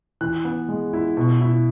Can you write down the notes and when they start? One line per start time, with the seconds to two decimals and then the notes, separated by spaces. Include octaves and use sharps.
0.21 E3 F#6
0.45 B3
0.69 G#3
0.93 E4
1.17 B2
1.41 E4